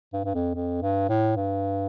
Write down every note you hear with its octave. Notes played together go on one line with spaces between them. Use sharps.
G2
G2
F2
F2
G2
A2
G2